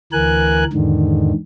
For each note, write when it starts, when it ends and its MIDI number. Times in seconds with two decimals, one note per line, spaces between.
0.13 0.64 38
0.13 0.64 52
0.13 0.64 70
0.13 0.64 80
0.13 0.64 90
0.73 1.32 40
0.73 1.32 44
0.73 1.32 50
0.73 1.32 51